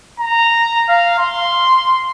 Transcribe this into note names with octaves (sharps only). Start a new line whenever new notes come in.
A#5
F5
C6